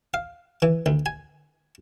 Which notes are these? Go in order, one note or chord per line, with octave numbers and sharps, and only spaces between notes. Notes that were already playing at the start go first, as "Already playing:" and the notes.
F5
E3
D2
G#5